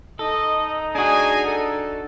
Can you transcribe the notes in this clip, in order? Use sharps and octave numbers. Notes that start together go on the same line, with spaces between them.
D#4 A4 D#5
D4 F#4 G#4 G#5
A4